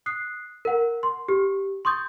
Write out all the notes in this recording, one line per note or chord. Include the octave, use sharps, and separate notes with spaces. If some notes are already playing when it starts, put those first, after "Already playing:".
D#6 F#6 C7
A#4 F#5
C6
G4
C6 C#6 D#6 G6 A6